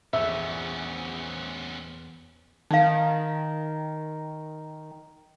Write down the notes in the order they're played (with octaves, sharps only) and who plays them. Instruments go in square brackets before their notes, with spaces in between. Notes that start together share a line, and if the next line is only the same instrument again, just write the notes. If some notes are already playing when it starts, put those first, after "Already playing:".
[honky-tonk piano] A#1 [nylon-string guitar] E2 [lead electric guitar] B3 C#4 [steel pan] E5
[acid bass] D#3 [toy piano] D#4 F5